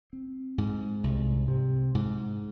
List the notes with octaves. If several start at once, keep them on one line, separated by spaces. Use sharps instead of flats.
C4
G#2
C2
C3
G#2